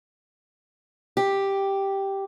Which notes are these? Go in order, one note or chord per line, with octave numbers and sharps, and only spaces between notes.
G4